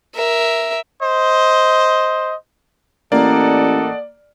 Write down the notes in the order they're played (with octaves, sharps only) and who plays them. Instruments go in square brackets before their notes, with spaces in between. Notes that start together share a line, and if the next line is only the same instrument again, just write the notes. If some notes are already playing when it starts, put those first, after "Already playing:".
[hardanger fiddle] A#4 E5
[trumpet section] C5 D#5
[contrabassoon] A1 [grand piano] A#3 [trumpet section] A4 D#5 F#5 [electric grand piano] D5